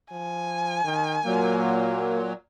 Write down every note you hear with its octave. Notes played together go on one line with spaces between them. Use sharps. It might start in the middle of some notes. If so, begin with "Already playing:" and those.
F3 G#5
D#3
A#2 F#3 A#3